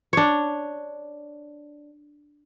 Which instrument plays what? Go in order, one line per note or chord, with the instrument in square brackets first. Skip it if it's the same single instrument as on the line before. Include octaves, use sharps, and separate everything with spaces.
[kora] D4 C#5